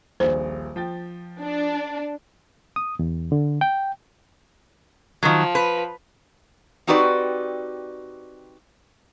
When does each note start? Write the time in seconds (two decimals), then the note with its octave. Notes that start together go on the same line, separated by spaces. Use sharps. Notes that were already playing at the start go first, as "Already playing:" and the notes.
0.20 D#1 A#1 C5
0.76 F3 G5 A6
1.41 D4
2.76 D#6
2.99 E2
3.32 D3
3.61 G5
5.23 D#3 F3 F#3
5.55 B4
6.87 C4 D#4 F#4 G4 B4 D5